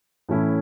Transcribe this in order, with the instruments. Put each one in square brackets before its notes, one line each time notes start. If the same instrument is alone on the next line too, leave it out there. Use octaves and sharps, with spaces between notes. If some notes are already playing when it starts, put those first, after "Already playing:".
[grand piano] A2 E3 A3 C#4 E4